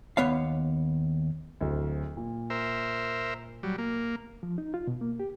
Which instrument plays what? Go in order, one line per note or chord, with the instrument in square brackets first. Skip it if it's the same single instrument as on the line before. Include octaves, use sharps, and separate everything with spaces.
[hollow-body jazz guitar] D#2 B3 C#5 F5
[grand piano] D1 D2
A#2
[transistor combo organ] A#4 C5 E5
F#3 G3
A#3
[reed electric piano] F3
D#4
F4
B2
A#3
G4